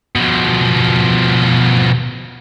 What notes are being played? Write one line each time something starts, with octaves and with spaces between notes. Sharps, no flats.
B2 F3